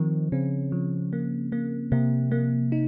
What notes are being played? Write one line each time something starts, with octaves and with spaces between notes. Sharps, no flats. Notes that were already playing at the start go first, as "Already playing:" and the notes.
Already playing: D#3 F3 C4
C#3 C4
F3
A#3
A#3
C3 A#3
A#3
D#4